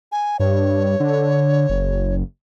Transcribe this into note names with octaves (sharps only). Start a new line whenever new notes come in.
G#5
G2 C#5
D3
F#1